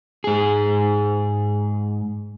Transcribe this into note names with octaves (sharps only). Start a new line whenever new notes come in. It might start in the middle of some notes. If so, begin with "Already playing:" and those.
G#2 G#4